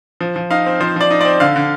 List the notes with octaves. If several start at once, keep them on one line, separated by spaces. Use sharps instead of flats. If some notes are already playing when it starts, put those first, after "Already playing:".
F3
F3
D#4 F5
C4
F3 C5
F3 D5
D#4
C4 D5
D3 F5
D3